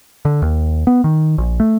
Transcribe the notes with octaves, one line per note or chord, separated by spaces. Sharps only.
D3
D#2
B3
D#3
A#1
A3